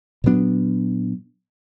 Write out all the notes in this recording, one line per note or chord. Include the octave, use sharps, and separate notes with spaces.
A#2 F#3 B3 D4